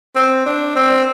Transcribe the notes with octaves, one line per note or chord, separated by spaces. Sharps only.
C4
D4
C4